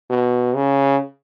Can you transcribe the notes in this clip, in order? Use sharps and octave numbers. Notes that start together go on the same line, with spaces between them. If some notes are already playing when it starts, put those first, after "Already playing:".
B2
C#3